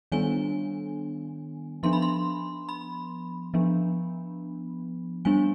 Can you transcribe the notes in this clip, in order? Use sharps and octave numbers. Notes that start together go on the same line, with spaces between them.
D#3 G3 B3 D4 G#5
F3 B3 D4 C6
B5
C6
B5
F3 B3 D4
G3 B3 D4 G#5